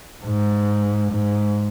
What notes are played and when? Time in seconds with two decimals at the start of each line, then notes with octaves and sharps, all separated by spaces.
0.24 G#2
1.11 G#2